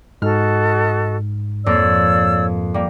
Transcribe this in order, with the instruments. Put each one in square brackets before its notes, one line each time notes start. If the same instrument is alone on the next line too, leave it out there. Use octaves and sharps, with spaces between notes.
[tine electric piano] G#2 [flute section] F#4 A4 D#5 [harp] F6
[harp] F2 A#3 [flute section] C#5 D5 E6
[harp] G3 A#3